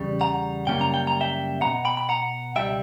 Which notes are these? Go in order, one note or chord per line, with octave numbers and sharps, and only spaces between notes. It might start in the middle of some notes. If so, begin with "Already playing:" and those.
Already playing: E2 C#3 G3
F#5 A#5
F#2 C#3 G3 A#3 C#4 G5
A#5
G5
A#5
E5 G5
B2 F#3 B3 F#5 A#5
G5 B5
B5
F#5 A#5
C#2 B2 G3 E5 G5